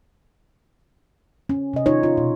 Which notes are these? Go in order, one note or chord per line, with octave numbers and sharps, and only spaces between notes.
C#4
C3 D#5
D#4 F4 C#5
F4
B2